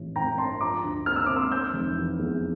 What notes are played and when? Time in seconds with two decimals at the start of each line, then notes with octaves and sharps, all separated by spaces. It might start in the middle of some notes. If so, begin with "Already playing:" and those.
Already playing: A1 E3
0.16 A1 G5 A#5
0.38 G2 A5 C6
0.61 F3 A#5 D6
0.84 D2
1.06 A#3 F6
1.16 E6
1.26 C3 D6
1.36 C6 E6
1.51 C3 E6 G6
1.74 F1
1.96 E3
2.19 E2